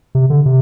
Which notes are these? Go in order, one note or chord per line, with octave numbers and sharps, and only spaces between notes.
C3
D3
C3